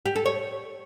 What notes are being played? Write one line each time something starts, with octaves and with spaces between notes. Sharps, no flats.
G4
A4
C#5